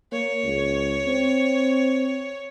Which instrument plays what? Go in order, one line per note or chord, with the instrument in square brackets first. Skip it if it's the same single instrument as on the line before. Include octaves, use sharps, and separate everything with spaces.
[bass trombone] A#3 [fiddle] C#5
[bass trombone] C#2
C4